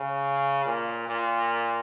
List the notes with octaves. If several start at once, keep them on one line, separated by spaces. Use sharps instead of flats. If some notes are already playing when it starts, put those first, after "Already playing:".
Already playing: C#3
A#2
A#2